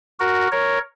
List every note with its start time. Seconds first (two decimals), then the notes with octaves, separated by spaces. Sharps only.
0.20 F#4 A#4
0.52 A#4 C#5